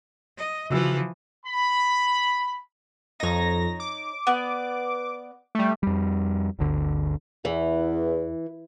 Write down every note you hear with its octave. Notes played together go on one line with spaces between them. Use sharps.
D#5
C#3 E3 F3 F#4 E6
B5
F2 D#4 C#5 A#6
D6
B3 D5
G3 A3
F2 G3
G1 D2 D3
E2 E3